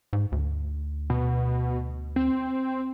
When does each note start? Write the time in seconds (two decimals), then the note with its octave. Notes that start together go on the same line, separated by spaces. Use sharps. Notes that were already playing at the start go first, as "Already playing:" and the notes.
0.13 G#2
0.32 D2
1.10 B2
2.16 C4